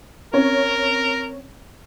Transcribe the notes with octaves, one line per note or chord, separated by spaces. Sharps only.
C4 C#4 A#4 C#5